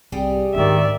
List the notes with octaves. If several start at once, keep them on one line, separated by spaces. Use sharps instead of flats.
C2 G3 G4 G#4
G#2 D#3 D4 D5 E5